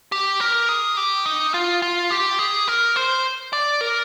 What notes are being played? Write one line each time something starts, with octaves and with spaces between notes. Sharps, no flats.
G4
A#4
G#4
G4
D#4
F4
F4
G4
G#4
A#4
C5
D5
A#4